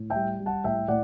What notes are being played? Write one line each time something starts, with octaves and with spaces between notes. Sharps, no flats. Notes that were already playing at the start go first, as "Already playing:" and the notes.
Already playing: A2
E5 G5
G3
G3
F#5 A5
A2 E5 G5
A2 D5 F#5